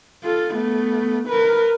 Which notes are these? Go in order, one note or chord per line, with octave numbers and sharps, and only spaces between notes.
F4 A4
A3 B3
A#4 B4